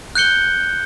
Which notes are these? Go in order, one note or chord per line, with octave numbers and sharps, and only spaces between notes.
F#6 G6 C#7 G7